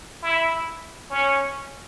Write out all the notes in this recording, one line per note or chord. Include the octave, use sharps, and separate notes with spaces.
E4
C#4